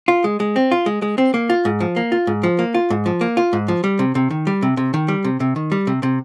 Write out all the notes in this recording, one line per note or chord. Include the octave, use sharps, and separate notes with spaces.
F4
G#3
G#3
C4
F4
G#3
G#3
C4
A#3
F4
G#2
F3
A#3
F4
G#2
F3
A#3
F4
G#2
F3
A#3
F4
G#2
F3
G3
C3
C3
D#3
G3
C3
C3
D#3
G3
C3
C3
D#3
G3
C3
C3